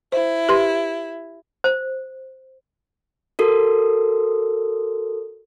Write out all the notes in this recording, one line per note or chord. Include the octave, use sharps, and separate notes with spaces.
E4 C5
G4 B4 C6
C5
F#4 A4 A#4